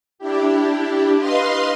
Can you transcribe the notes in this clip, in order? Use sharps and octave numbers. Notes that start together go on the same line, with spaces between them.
D4 E4 G4
B4 D#5 F5 C6